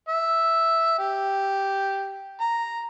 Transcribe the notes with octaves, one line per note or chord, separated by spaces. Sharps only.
E5
G4
A#5